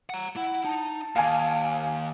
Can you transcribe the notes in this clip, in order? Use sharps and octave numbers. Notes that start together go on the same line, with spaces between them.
F#5 A#5
E4 F#5
D#4 A5
D#2 F5 G#5